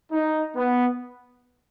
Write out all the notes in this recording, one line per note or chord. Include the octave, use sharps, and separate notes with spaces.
D#4
B3